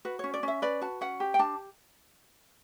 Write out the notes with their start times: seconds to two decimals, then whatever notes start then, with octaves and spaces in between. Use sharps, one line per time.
0.05 F#4 B4
0.19 C#4 C#5
0.34 D5
0.43 C#4 E5
0.62 B4 D5
0.81 F#4 A5
1.01 C#4 F#5
1.20 G4
1.34 G5
1.39 D4 A5